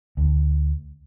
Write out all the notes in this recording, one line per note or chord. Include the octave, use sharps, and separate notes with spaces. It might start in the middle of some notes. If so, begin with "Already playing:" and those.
D2